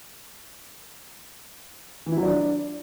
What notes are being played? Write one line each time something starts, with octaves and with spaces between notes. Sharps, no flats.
E3
E4
F#3
D4